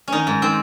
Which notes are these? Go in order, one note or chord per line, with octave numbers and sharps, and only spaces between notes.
D#3 C#4 D#4
G#2
D#3 C4